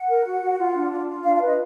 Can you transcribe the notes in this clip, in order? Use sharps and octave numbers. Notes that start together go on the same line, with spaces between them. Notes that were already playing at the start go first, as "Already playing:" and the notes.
Already playing: F#5
A#4
F#4
F#4
F4
D4
F4
F4
D4 F5
F5
B4
D#5